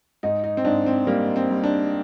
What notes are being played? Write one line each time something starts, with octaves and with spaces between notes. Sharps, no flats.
G#2 D#4
D#4
C4
G#2 D4
C4
G3 A#3
C4
G3
D4